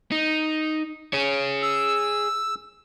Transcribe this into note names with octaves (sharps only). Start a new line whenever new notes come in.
D#4
G#4 C#5
E6